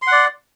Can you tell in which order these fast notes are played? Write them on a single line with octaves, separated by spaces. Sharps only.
C6 F#5 D5